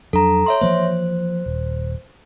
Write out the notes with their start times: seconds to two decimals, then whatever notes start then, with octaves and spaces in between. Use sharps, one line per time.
0.13 F2 F#3 D4 A4 A#5
0.46 C#5 E5 C6
0.61 E3 F3 A#3 C5
1.46 D#1